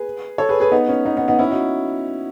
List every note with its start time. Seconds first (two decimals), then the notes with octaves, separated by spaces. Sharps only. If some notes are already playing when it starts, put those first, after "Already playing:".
Already playing: G#4 B4
0.38 A4 C#5
0.49 G#4 B4
0.60 G#4 B4
0.72 B3 D#4
0.89 C#4
1.06 B3 D#4
1.17 B3 D#4
1.28 B3 D#4
1.39 C#4 E4
1.51 D#4 F#4